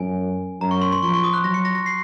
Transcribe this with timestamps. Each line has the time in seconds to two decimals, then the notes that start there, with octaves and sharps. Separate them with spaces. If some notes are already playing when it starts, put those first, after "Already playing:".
Already playing: F#2 G#5
0.61 F#2 A#5
0.71 C#6
0.81 C6
0.92 C6
1.03 F3 C#6
1.14 C#6
1.24 D#6
1.34 F#6
1.44 F#3 A#6
1.54 C#7
1.65 A#6
1.75 A#6
1.86 C7